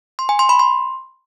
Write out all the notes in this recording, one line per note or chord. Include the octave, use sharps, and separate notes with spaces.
C6
G#5
C6
B5
C6